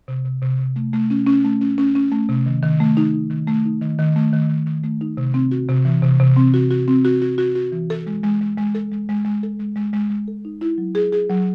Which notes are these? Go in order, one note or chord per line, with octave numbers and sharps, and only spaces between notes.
C3
C3
C3
C3
A3
A3
C#4
C#4
A3
C#4
C#4
C#4
A3
C3
D#3
D#3
A3
D#4
D#4
D#3
A3
D#4
D#3
D#3
A3
D#3
D#3
D#3
A3
D#4
C3
C4
F#4
C3
E3
C3
C3
C4
F#4
F#4
C4
F#4
F#4
F#4
F#4
E3
A4
G#3
G#3
G#3
G#3
A4
G#3
G#3
G#3
A4
G#3
G#3
G#3
G#3
A4
D#4
E4
F#3
G#4
G#4
F#3